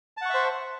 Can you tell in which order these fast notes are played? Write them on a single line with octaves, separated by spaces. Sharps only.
A5 F#5 C#6 E5 C5